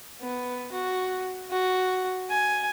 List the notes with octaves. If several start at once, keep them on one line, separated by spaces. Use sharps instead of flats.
B3
F#4
F#4
G#5